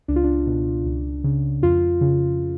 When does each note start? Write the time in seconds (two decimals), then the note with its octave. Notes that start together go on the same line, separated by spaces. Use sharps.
0.08 C#2 D4
0.16 F4
0.24 D4
0.46 B2
0.85 C#2
1.24 C#3
1.62 F2 F4
2.01 C#3